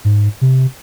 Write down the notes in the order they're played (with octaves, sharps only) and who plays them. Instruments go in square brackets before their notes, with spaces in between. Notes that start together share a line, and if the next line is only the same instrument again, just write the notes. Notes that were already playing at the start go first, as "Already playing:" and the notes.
[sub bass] G#2
C3